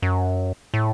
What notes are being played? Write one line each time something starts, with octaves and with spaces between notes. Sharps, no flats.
F#2
A2